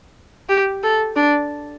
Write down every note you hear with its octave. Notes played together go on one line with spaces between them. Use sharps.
G4
A4
D4